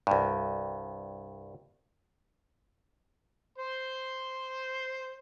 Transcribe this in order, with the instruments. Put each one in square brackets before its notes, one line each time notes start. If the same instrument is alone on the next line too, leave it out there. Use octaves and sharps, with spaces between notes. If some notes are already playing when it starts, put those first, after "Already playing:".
[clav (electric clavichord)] C2 G2
[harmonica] C5 C6